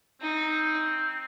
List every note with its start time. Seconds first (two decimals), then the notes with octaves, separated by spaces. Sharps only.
0.21 C4 D#4